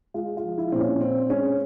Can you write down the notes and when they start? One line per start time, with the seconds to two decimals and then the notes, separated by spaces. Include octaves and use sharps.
0.14 G#3 F4
0.37 F4
0.43 F3
0.58 E4
0.72 A#2 C4
0.79 C#4
1.01 C4
1.29 G#3 C#4